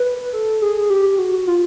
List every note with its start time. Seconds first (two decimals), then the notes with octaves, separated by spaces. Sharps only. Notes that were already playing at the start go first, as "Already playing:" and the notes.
Already playing: B4
0.33 A4
0.62 G#4
0.90 G4
1.19 F#4
1.47 F4